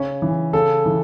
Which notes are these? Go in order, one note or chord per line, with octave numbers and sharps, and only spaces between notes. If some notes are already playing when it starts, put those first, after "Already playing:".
Already playing: C#3 C#4
E3
C#3 A4
E3